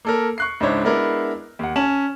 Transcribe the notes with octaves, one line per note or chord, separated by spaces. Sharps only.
A#3 A4 A#4
C#6 F#6 C7
C#2 G#2 D4 E4 C5 C#5
G#3 B3 D4 E4 A#4
D#2 F#5
C#4 G#5 A5 E7 F#7